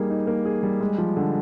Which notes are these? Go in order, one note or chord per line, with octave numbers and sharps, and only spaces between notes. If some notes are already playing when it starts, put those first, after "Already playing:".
Already playing: G3 A#3 D#4 G#4
D#4
A#3
G#4
G3
G#3
F3
D3